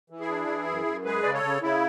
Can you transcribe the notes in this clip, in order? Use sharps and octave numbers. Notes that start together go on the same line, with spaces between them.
E3
E4 G#4
D4
E3
F#2
F#2
G#3 G#4 B4
C#3 D5
A4 C#5
C#3
C#3 E4